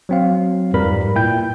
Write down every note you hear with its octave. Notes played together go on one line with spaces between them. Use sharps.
F#3 C4 F5
F2 G#2 G3 A#4 B4 B5
A#2 E4 G5 G6